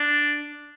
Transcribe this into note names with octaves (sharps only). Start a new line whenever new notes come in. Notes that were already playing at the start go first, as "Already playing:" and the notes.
Already playing: D4